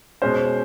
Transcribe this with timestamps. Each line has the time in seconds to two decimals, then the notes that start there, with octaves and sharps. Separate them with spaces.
0.22 B2 G#3 C#4 C5